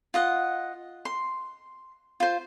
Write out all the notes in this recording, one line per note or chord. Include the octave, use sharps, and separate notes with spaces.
F4 D#5 F#5
C6
F4 C5